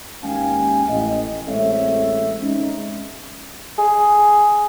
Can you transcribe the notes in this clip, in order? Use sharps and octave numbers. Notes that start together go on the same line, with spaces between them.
D#2 G#3 C#4 F5 G5 G#5
A1 D#5
A1 G#3 C4 A4 C#5 E5
G#3 C#4 D#4
G#4